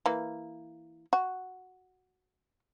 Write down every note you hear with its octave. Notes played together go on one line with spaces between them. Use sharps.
E3 A#3
F#4